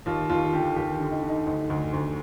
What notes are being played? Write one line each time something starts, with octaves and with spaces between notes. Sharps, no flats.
D#2 F4
D#2 F4
D3 G4
D#2 G4
D3
D#4
D3
D#4
D2 D#4
D2
D2